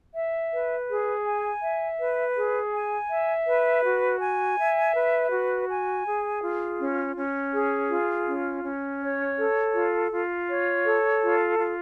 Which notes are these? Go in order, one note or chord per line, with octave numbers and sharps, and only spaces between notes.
E5
B4
G#4
G#5
E5
B4
G#4
G#5
E5
B4
F#4
G#5
E5
B4
F#4
G#5
G#4
F4
C#4
C#4
G#4
F4
C#4
C#4
C#5
A4
F4
F4
C#5
A4
F4
F4